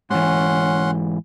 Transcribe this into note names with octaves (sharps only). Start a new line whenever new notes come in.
G#2 E3 C#4 F#5 C6